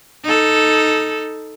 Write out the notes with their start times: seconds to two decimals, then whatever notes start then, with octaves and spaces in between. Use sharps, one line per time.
0.24 D#4 A4